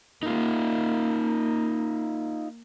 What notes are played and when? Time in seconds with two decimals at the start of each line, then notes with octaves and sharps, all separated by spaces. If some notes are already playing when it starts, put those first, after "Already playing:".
0.23 A#3 D#4 F4